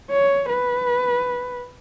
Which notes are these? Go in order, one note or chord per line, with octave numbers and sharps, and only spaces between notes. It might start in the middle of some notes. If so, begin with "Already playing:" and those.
C#5
B4